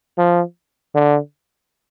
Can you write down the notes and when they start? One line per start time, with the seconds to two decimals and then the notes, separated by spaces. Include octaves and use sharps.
0.18 F3
0.95 D3